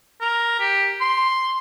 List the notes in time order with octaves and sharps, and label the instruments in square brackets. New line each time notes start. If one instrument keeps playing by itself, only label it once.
[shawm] A#4
G4
C6